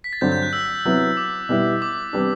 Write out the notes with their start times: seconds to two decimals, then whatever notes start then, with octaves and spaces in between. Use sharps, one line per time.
0.04 B6
0.13 A6
0.21 G2 D3 F#3 C4 G6
0.32 G6
0.43 F#6
0.53 E6
0.85 C3 F#3 B3 E4
1.17 D6
1.49 B2 G3 B3 E4
1.82 D6
2.13 C3 G3 B3 D4